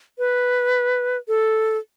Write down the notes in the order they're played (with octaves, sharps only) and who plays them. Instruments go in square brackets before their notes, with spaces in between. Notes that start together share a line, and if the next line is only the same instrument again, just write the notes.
[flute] B4
A4